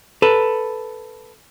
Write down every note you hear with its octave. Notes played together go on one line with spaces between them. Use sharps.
A4 B4